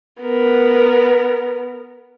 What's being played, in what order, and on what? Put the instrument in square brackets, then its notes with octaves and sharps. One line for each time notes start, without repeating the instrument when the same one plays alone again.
[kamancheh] B3 A#4